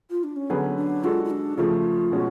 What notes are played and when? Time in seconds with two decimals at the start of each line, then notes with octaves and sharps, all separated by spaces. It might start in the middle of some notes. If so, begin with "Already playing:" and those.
0.10 F4
0.24 D4
0.36 C#4
0.50 D3 F#3 B3 C#4 G#4 B4
0.77 D4
1.04 G#3 D4 F4 F#4 A4
1.25 F4
1.30 D4
1.57 C#3 F3 A3 F4
2.12 B2 G#3 C#4 F#4